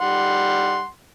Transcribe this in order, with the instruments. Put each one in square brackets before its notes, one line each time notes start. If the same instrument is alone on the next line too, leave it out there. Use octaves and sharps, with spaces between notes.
[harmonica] G3 F#5 C6